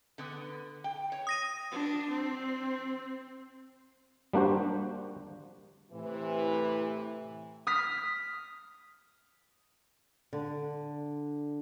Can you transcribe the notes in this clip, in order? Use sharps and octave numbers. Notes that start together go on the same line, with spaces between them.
D3 B3
G5
C#5
D#6 A#6 D#7
D4
C4
G3 A#3 D4 F#4 C5
A2 C3 E3
D#6 F6 B6
D3